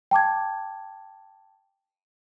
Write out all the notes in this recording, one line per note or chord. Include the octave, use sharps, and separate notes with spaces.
G5 A5 D6 G#6